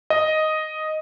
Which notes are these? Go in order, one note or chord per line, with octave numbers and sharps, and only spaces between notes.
D#5